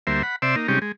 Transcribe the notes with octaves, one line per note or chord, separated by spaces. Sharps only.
D2 G3 A#3 C5 E5
F#5 B5
C3 C5 D5 E5 E6
A#3 D#4
C3 G3 G#3 C#4 D#4 G4
G#3